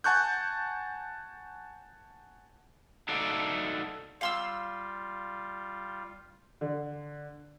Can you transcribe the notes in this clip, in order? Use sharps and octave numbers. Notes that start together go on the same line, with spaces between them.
F#5 G#5 A5 C#6 F#6 G6
D#4 F#4 A4 D5 E5 F5
G3 F4 F5 C6 E6
D3